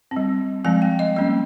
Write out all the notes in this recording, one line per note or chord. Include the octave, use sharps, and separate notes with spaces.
C4
G3
F3 G#3 C4 G#5
G5
D#5
G3 A#3 C#4 D#5